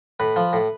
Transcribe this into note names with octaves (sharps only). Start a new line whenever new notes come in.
A2 B4
F3
A2